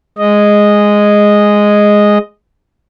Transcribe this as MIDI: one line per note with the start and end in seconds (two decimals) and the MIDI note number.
0.18 2.18 56
0.18 2.18 75